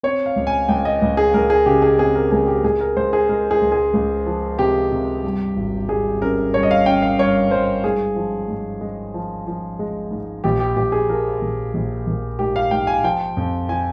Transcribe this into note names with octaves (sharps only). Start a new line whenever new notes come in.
C4 C#5
F5
C#2
G#5
C#2 G5
D#5
C#2
G#4
C#2 A#4
G#4
C#3 G4
G#4
C4 G#4
A#4
C#2 G#4
G4
C#2 G#4
A#4
C#2 C5
G#4
G#3 A#4
G#4
C#2
G#4
C#2
F3
C3 G4
C3
G2
G#1
G3 G#4
C#4 A#4
G2 C#5
D#5
F5
C#4 G5
F5
G2 C#5
G2 C5
G#2 G#4
F3
G#2
G#3
F3
F3
G#3
G#2
A#1 G4
G4
A#1 G4
G#4
F3 A#4
A#1
A#1
A#1
G#2 G4
F5
G#2 G5
G#5
F3 G5
F2
F3 G#5